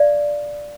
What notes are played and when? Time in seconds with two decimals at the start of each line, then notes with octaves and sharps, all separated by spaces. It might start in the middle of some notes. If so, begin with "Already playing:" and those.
Already playing: D5 F5